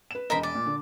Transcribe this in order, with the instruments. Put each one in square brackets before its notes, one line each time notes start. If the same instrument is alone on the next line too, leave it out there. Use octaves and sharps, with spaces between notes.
[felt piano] B4 E7
[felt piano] E1 D#5 [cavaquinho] A#4 C5 B5
[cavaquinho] D5
[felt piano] A#2
D3